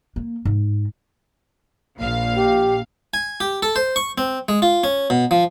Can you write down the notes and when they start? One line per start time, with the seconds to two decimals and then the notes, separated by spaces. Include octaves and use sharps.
0.16 A#3
0.45 G#2
1.97 A#1 A#2 F5
2.36 G4
3.14 G#5
3.40 G4
3.63 A4
3.76 C5
3.96 C#6
4.18 C4
4.49 G#3
4.62 F4
4.84 C#4
5.10 B2
5.31 F3